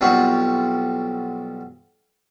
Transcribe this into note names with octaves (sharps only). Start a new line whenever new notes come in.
B1 G3 C4 F4 F#4